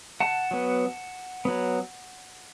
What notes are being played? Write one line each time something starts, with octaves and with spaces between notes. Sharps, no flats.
F#5 A5
F#3 B3
F#3 B3